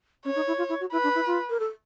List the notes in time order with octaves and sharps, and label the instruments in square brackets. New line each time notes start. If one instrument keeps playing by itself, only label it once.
[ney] C#4 [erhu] C#5
[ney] D#4
E4
F4
E4
F#4
[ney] E4 [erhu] B4
[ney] D4
E4
F4
A#4
A4